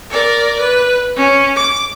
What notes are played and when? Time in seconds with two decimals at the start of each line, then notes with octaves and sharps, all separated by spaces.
0.10 A#4 D5
0.60 B4
1.16 C#4
1.56 D6